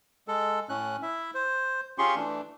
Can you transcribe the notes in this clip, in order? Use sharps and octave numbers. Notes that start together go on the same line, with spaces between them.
G#3 A4
A2 C#4 F#6
E4 E5
C5
C#4 F4 G4 G#4 C6 C#6
E3 A3 D4